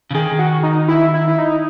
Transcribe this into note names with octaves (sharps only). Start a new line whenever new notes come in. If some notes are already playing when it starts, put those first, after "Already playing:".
C#3
D#3 G#4
F#4
D#4
E4
E4
E4
D#4